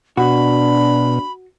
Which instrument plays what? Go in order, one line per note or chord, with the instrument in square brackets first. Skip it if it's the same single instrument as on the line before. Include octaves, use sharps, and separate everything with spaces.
[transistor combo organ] B2 [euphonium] D4 [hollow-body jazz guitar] F#4 [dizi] B5